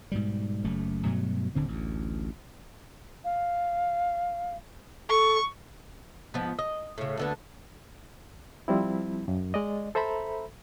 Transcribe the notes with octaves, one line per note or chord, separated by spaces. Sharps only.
G#2 B2 G3
F#1 F#2 A3
G2 B2 F#3 A3
D1 D3 C4
A1 D2
F5
A4 C#6
G#2 F3 B3
D#5
A2 C#3
D2 D3 B3
F3 G3 C4 E4
F#2
G#3 D5 D#5
A4 C5 E5 A#5 B5